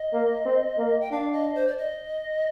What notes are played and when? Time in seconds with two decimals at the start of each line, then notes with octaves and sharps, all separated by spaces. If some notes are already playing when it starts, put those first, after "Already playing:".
Already playing: D#5
0.13 A#3
0.45 C4
0.78 A#3
1.01 G5
1.11 D4 F5
1.33 D#5
1.55 C5
1.68 D5
1.78 D#5